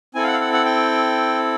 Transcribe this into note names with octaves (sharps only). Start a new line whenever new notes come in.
C4 E4 A4 G#5
F5
F#5
F5
F#5
F#5
G5